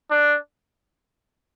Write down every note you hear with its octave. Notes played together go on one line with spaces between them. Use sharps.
D4